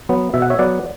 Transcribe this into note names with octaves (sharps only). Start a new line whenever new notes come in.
F#3 B3
B2 E5
F#5
C#5 E5
F#3 B3 D5 F#5